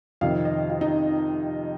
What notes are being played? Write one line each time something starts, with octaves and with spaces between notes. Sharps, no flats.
F2 C3 D#3 F5
D#5
F4
D#4